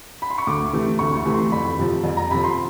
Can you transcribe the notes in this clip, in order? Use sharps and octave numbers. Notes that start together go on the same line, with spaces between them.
B5
C6
C#6
D2 D6
C3 E3 A3
D2 C#6
C#6
C3 E3 A3
C6
F2 B5
C3 F3
F2
A#5
C3 F3 B5
C6